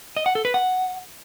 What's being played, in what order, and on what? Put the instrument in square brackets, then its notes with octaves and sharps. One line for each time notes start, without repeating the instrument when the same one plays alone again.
[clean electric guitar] D#5
F#5
A4
B4
F#5